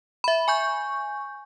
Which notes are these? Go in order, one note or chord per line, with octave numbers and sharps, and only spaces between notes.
E5 B5
G#5 C#6 G6